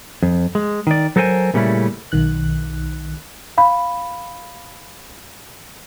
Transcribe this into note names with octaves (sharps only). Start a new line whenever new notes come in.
F2
G#3
D#3 D5
F#3 A4 A#4 C5 G#5
A#2 C#3 G3 A3 C#4 E4
B1 D#3 F#6
F5 B5